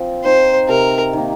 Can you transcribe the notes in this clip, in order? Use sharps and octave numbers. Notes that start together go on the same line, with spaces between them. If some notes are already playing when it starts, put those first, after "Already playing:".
Already playing: F3 C4
C4 D#4 C5
C3 A#4
D#3 A#3